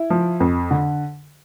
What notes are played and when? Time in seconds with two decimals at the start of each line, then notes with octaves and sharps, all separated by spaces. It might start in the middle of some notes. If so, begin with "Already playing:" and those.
Already playing: E4
0.10 F3
0.40 F2
0.71 D3